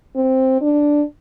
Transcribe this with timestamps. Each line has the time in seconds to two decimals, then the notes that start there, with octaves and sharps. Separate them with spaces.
0.15 C4
0.61 D4